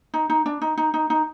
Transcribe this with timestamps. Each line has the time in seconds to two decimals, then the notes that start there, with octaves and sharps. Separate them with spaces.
0.14 D#4
0.30 D#4
0.46 D4
0.62 D#4
0.77 D#4
0.94 D#4
1.10 D#4